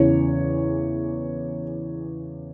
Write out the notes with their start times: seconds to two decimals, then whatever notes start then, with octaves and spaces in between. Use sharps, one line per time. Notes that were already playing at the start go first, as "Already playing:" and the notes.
Already playing: E2 C#3 E3 C#5